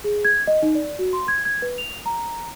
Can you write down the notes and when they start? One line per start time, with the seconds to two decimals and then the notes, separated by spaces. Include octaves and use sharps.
0.04 G#4
0.25 G#6
0.47 D#5
0.62 D#4
0.75 D5
0.99 F#4
1.13 C6
1.28 G#6
1.45 G#6
1.62 B4
1.78 F7
2.06 A#5